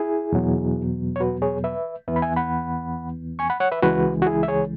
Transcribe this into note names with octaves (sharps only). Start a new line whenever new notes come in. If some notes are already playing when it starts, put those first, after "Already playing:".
Already playing: E4 G#4
E2 B2 F#3 B3
C#5
F#4 B4
G#4 C#5
B4 E5
E2 E3 B3 B4 E5
B5
E5 G#5
F#5 B5
G#5 C#6
F#5 B5
C#5 F#5
B4 E5
C#2 C#3 E3 G#3 F#4 B4
F#4
E4 G#4
E5
G#4 C#5